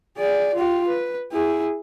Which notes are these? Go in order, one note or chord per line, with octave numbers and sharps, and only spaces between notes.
G#4 D5
F4 G4
B4
E4 G#4